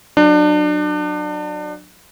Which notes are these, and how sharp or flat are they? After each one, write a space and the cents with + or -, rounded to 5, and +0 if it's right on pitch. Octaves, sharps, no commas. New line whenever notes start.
F#3 +0 D4 +30